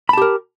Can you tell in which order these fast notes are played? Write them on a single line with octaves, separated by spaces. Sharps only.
B5 A5 G4 A#4